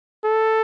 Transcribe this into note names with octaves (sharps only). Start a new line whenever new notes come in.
A4